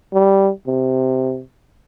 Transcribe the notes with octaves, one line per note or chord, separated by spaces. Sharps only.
G3
C3